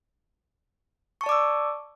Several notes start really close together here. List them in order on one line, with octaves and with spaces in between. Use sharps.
C#6 A5 D5 D6 E6